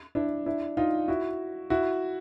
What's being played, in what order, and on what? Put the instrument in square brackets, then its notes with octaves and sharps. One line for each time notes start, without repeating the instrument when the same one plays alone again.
[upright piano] D4 E4
D4 E4
D#4 F4
E4 F#4
E4 F#4